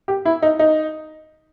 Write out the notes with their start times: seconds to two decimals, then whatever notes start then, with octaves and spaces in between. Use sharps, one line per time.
0.08 G4
0.25 E4
0.42 D#4
0.59 D#4